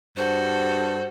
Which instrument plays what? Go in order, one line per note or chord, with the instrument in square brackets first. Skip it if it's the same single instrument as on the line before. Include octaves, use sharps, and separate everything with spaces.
[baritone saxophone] G2 [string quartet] F#4 A4 [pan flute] C5